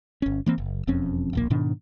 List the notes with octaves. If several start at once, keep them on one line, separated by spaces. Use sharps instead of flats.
G1 C#4
E3 A#3 C4
F#1
E1 F2 C4 C#4
D1 A#1 A#3
G#2 B2 D#3 D4